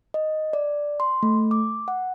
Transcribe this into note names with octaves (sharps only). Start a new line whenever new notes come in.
D#5
D5
C6
A3
D6
F#5